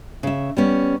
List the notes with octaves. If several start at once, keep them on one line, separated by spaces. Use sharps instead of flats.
C#3 E5
G3 B3 C#4